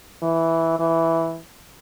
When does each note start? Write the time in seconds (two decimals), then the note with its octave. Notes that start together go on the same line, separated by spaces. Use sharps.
0.22 E3
0.79 E3